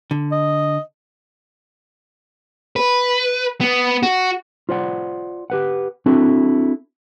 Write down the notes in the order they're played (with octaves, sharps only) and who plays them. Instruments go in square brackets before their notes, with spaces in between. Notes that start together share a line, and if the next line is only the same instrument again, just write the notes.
[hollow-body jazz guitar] D3
[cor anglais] D#5
[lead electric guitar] B4
B3
F#4
[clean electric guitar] F4 C5 D5 F#5
G4 B4 F#5
C4 D4 E4 F#4 A4